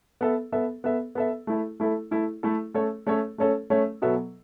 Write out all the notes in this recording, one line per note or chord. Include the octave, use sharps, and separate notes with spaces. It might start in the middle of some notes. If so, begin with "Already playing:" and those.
B3 A4 E5
B3 A4 E5
B3 A4 E5
B3 A4 E5
A3 E4 A4
A3 E4 A4
A3 E4 A4
A3 E4 A4
A3 C#4 A4 C#5
A3 C#4 A4 C#5
A3 C#4 A4 C#5
A3 C#4 A4 C#5
B2 F#3 B3 A4 E5